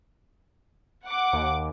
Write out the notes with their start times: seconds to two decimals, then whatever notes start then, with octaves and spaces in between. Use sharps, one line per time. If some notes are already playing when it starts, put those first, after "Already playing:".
1.04 F#5 D6
1.33 D#2